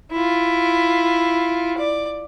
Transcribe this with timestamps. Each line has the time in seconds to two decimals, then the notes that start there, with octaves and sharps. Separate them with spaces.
0.11 E4 F4
1.77 D5